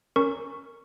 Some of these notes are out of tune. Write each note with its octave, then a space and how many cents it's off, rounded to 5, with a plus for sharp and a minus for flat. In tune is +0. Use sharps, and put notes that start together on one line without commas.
C#4 +0 A#4 +0 C#6 +0